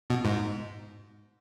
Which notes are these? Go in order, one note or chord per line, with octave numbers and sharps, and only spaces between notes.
B2
G#2